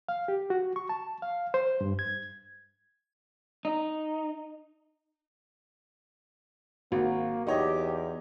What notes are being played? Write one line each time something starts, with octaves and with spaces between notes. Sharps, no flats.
F5
G4
F#4
C#6
A5
F5
C5
G2
G#6
D#4
G#1 A#3 F#4
E2 D#4 G4 C#5 D#5